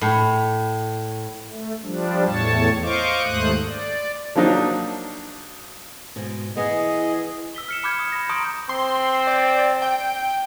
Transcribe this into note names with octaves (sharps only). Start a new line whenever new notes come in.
A2
A3
F3 G3 D4
E2 A2 C#5 A5
C5 D#5 F5 C#6 D6
D#2 G#2 A3 C5 D#6 F#6
D5
F3 F#3 A#3 D4 D#4
G#2 B2
E3 B3 G#4 D#5
E6 B6 G7
F6 C#7 E7
B5 D6 F6 G6 G#6
D#6
B5 A#6
A#5 C6 C#6 D#6 G6 D7
C4 C6
D5
G5